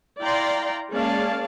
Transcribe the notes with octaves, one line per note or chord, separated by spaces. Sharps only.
E4 D5 F5 G5 A#5 C6
G#3 A#3 C#4 D5 F5 A5